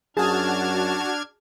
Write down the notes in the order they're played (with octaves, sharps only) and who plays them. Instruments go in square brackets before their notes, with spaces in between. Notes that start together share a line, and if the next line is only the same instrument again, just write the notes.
[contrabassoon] F#2 [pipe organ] D4 F6 G#6 [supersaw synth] F#4 A5 [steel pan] G#4